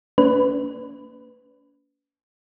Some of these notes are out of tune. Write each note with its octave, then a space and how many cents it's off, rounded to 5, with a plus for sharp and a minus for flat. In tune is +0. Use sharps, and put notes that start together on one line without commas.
A#3 -20 C#4 +40 B4 +15